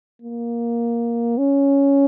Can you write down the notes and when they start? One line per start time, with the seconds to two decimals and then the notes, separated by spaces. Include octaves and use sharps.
0.22 A#3
1.38 C#4